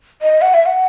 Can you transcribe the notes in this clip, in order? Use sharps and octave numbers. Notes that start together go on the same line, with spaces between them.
D#5
F#5
E5
F#5